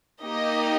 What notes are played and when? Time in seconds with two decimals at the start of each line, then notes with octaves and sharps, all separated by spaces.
0.22 A#3 D#4 G4 D#5